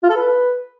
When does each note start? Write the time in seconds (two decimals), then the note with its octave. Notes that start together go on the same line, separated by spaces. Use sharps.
0.03 F4
0.10 A4
0.16 B4